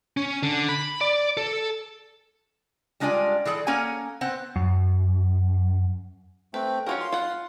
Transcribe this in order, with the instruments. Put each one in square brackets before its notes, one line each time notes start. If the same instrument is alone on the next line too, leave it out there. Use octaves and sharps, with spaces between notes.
[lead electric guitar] C#4
D3
B5
D5
A4
[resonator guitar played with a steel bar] G3 G#3 D4 F4 D5 G#5
E3 G#4 A4 D5
A#3 C#4 A4 C#5 F#5 G#5
B3 C4 C5 F#5
[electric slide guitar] F#2
[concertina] A3 C4 G5 [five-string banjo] B4
[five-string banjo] C#4 F4 A#4 [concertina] F#4 G#4
[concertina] F5 C6
[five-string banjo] F4 F#5